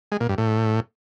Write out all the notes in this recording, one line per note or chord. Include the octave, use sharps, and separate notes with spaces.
G#3
A#2
G2
A2